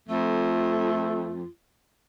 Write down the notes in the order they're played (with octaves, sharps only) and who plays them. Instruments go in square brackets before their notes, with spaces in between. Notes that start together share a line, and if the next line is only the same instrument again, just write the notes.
[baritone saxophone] F2 [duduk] A3 [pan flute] F4